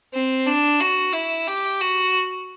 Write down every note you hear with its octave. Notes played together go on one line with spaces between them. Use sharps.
C4
D4
F#4
E4
G4
F#4